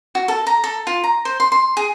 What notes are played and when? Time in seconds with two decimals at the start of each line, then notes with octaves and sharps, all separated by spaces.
0.15 F#4
0.28 A4
0.47 A#5
0.64 A4
0.87 F4
1.04 A#5
1.25 C5
1.40 C6
1.52 C6
1.77 G#4